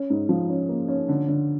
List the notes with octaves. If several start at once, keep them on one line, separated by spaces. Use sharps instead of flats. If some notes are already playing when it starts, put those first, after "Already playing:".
Already playing: C#4
G#2
F3
C#4
A#3
C#4
D3
D3